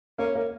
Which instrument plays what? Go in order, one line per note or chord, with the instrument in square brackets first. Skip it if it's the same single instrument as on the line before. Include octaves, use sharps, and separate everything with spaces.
[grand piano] A#3 [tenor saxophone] C#4
[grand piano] A#3